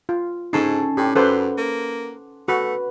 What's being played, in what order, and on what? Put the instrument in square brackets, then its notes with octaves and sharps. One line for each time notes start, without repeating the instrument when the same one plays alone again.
[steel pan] F4
[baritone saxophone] G#2 [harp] C#4 A4 C7 [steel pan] D#4
[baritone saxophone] A2 [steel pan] G4
[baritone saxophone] F#2 [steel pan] A4 B4 C5 [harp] F#5 C6 D6
[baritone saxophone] A#3
[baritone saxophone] A3 [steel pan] F#4 [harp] B4